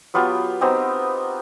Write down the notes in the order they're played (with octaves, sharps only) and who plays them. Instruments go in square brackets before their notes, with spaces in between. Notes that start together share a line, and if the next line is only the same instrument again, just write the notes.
[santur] F#3 B3 F4 G4
B3 C4 D#4 G4